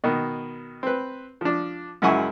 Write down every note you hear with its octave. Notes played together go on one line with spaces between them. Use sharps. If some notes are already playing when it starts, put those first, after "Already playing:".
B2 D#3
C4 B4
F3 D4
C#2 F#2 E4 F#5 G#5 C#6